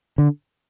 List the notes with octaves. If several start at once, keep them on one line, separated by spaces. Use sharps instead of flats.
D3